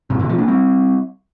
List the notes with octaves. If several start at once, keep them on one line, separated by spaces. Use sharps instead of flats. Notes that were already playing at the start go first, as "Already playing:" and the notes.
G2 C3
A#2 D3
C3 F3
A#3 D4
G3 C4